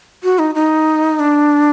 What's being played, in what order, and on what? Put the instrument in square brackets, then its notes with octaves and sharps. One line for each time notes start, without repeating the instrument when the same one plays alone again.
[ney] F#4
D#4
D#4
D4